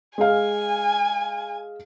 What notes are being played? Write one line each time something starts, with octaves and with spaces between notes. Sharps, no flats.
G#3 F5 G#5